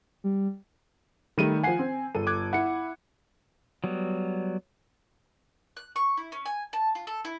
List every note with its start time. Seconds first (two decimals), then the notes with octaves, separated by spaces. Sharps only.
0.24 G3
1.38 D#3 G3 A3 D#7
1.64 F3 F#5 G#5 C7
1.79 C4
2.15 G1 A4 D#7
2.27 D6 F#6 G#6
2.53 E4 F#5 C#7
3.84 F#3 G3 B3
5.77 F#6
5.96 C#6
6.17 E4
6.32 C#4
6.46 G#5
6.73 A5
6.95 F4
7.07 A4
7.25 E4